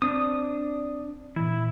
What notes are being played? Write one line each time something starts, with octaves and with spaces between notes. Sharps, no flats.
C4 D4 D#6
A#2 E3 E4